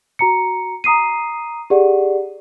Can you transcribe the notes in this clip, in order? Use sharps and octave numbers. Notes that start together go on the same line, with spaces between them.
F#4 A#5 C#7
A#5 D#6 C7 D#7
G4 G#4 D5 F#5